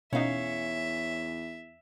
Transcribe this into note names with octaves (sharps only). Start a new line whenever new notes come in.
E2 B2 C#4 D#4 E5 F5